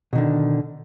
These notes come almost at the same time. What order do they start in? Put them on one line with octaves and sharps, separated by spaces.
B2 D#3 D3